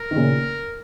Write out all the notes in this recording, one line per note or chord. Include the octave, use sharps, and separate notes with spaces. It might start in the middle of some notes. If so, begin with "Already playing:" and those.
Already playing: A#4
D#3
A#2 C#3